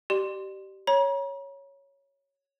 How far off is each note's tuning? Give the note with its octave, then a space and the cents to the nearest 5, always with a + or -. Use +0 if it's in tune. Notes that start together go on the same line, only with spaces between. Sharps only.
G4 -25 D5 +35 C6 +0
C#5 +0 A#5 +40